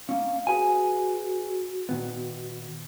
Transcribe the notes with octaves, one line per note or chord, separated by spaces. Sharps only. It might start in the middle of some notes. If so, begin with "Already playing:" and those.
A#3 C#4 F5
F#4 G#4 B4 G#5
A#2 D#3 B3